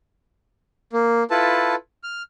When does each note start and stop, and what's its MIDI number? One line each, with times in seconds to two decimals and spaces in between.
0.93 1.23 58
1.30 1.75 64
1.30 1.75 65
1.30 1.75 69
1.30 1.75 71
1.30 1.75 81
2.03 2.22 89